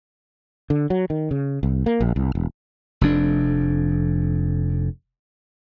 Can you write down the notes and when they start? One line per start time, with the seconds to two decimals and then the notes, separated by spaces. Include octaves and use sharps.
0.70 D3
0.90 F#3
1.10 D#3
1.31 C#3
1.63 C2
1.86 A#3
2.00 A#1
2.16 C2
2.35 E1
3.01 F1 F2 D4